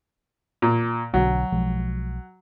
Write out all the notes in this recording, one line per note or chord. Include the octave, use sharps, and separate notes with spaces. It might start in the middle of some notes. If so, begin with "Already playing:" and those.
A#2
B1 D3 F#3
B1 F3 G#3